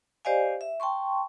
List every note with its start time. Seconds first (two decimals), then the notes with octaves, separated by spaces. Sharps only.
0.25 G4 C5 D5 D#5 F5 G#5
0.61 E5
0.80 G5 A5 C6 C#6